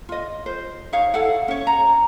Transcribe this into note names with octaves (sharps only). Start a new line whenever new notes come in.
F4 D#5
C5
D#4 C#5 F5
E4 A4 F5 F#5
C#4 C#5
A#5